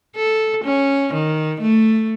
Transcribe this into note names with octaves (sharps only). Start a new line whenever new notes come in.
A4
C#4
D#3
A3